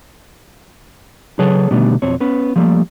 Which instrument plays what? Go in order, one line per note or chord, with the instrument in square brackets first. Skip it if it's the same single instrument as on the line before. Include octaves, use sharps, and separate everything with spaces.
[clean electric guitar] C#3 F#3 G#4 A4 B4 C#5
B2 D3 D#3 G3 A3 B3
B1 F2 C4 C#5
B3 C#4 B4
F3 G3 A3 A#3